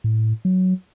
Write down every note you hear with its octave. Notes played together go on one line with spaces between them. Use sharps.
A2
F#3